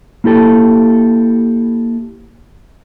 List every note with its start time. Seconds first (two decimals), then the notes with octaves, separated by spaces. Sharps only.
0.24 A#3 E4 G4 A4